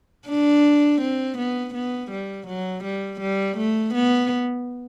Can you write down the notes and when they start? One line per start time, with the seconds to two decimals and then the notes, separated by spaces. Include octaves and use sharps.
0.28 D4
1.02 C4
1.38 B3
1.74 B3
2.11 G3
2.47 F#3
2.84 G3
3.21 G3
3.58 A3
3.94 B3